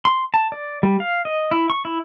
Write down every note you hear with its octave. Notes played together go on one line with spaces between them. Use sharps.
C6
A5
D5
G3
F5
D#5
E4
C#6
E4